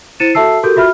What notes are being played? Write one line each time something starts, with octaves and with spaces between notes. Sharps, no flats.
E4 C5 A6 C#7 D#7 E7
F#4 A4 E5 A5 E6 C7
F#4 G4 A4 A#4 G6
F4 F#4 E5 B5 F6